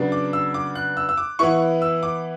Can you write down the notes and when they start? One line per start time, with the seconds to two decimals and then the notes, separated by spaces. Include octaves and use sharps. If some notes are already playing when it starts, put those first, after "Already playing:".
Already playing: C#3 F#3 B3 D4
0.12 D6
0.33 E6
0.54 D6
0.75 F#6
0.97 E6
1.09 E6
1.17 D6
1.39 E3 B3 E4 C#6
1.82 E6
2.03 D6